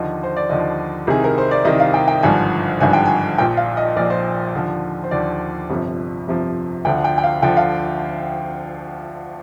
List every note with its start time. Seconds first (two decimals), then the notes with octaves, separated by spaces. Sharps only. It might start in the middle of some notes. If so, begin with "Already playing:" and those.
Already playing: D#2 D3 F3 D#5
0.23 C5
0.36 D5
0.49 D#2 D3 F3 D#5
1.07 C2 C3 D#3 G#4
1.24 A#4
1.38 C5
1.51 D5
1.65 C2 C3 D#3 D#5
1.80 F5
1.94 G5
2.08 G5
2.23 G#1 G2 D3 F3 G#5
2.80 G#1 G2 D3 F3 G#5
2.93 G5
3.06 G#5
3.38 A#1 A#2 F3 G5
3.57 F5
3.77 D#5
3.96 A#1 A#2 F3 D5
4.10 C5
4.54 D#2 D3 F3
5.04 C5
5.11 D#2 D3 F3 D5
5.70 G1 F2 C3 F3
6.27 G1 F2 C3 F3
6.85 D2 D3 F3 G5
7.04 G5
7.18 G5
7.24 F5
7.43 D2 D3 F3 G5
7.57 F5